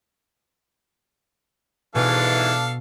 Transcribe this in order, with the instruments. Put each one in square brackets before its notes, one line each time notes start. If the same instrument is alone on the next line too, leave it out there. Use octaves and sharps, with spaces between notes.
[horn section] G#2 E3 [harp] B2 [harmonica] D4 A4 F5